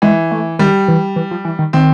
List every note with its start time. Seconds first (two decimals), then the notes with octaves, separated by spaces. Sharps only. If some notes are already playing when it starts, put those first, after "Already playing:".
0.02 E3 G#3
0.31 A3
0.59 D#3 G3
0.88 E3
1.16 E3
1.31 F3
1.45 E3
1.59 D#3
1.73 D#3 C4